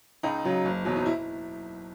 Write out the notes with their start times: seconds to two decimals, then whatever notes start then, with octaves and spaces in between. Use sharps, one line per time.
0.23 C#2 D#4
0.45 C#3 F#3
0.65 F#1
0.85 E2 B2 F#3
0.96 D#4
1.06 E4